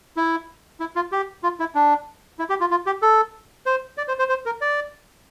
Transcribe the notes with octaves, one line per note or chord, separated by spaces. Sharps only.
E4
E4
F4
G4
F4
E4
D4
E4
G4
F4
F4
G4
A4
C5
D5
C5
C5
C5
A#4
D5